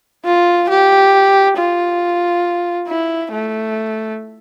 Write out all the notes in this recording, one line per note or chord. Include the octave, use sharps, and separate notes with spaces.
F4
G4
F4
E4
A3